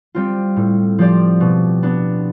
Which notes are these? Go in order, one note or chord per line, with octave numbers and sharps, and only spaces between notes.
G3 C4 F4
A2
F3 C4 G4 D5
B2
B3 D4